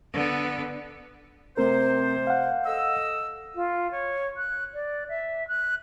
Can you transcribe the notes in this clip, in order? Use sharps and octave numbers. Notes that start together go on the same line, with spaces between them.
D3 B3
C3 A3 C4 A#4 C5
F5 F#5
A4 D#5 E6
F4
C#5
F#6
D5
E5
F#6